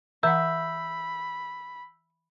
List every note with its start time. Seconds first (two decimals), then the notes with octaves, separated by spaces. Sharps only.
0.23 E3 E5 F#5 B5 E6 G6